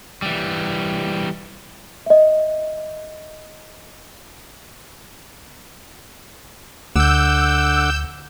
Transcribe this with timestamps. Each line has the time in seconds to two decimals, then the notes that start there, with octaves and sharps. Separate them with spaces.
0.22 E3 G3
2.06 D#5 E5
6.96 D2 D3 F#5 D6 E6 G6